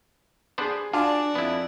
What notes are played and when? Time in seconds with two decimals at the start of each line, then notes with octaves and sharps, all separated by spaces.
0.58 B3 D4 G#4 C5 C7 F#7
0.93 D4 F4 F#4 D5 G#5 A5 D6
1.35 F2 B3 E4